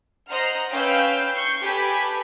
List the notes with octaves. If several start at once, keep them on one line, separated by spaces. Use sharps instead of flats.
C5 D#5 F#5 A#5 F6 C7
C#4 B4 F5 G5 E6 G6
C#6 G6 C7
G4 A4 B4 G#5 B5 B6